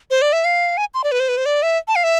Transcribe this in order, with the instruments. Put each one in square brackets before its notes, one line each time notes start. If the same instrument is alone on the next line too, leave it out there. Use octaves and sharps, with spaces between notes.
[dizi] C5
D5
E5
F5
G#5
C6
D5
B4
C5
B4
C5
D5
E5
A5
F5
E5